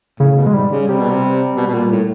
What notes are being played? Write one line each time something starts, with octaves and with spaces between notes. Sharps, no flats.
A2 C#3
B2
G#3
G#2 G3
C#3
C3 G3
B2
C3
B2
B2
A#2
A2